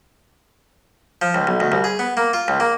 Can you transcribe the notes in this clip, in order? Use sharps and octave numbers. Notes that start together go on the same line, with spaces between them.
F3
C#2
B1
D2
C2
G#4
B3
A#3
F4
C#2
A#3